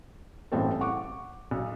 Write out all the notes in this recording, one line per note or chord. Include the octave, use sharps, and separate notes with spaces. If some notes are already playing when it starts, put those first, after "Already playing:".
A1 G2 E3 C4 F#4 A4
F#5 C#6 D6
B1